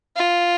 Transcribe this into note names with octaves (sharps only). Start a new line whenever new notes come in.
F4